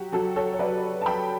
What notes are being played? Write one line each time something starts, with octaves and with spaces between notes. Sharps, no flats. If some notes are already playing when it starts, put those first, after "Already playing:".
Already playing: F#3 F#4 G4
F#3 F#4 A4
A4 C#5
C#5
F#3 B4 D5
A5
F#3 G5 B5